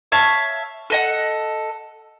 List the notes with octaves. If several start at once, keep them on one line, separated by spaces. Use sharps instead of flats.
C#5 E5 F5 A5
A4 D#5 F#5